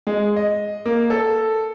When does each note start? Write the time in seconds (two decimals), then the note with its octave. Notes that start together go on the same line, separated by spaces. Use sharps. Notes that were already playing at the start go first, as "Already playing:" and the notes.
0.07 G#3
0.36 D#5
0.86 A#3
1.10 A4